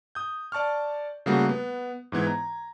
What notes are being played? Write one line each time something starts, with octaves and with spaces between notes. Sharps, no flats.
D#6 G6
D5 A5 C#6 F6
C#3 G3 A3 A#3 F#4
B3
G#2 E3 B3 G#6
A#5